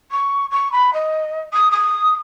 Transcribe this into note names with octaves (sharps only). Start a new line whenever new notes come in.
C#6
C#6
B5
D#5
D#6
D#6